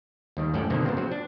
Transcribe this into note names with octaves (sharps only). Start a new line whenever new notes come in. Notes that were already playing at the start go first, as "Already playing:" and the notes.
D#2 D#3 G3
F#2 A2 C#4 A4 D5 G5
B2 D3 D#3 A#3 C4
A#2 C#3 G#3 B3 C4
F#3 C4 F#4
D4